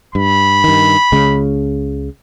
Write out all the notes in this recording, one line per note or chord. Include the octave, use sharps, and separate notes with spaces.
G2 B5
G2 D#3
C#2 C#3 G#3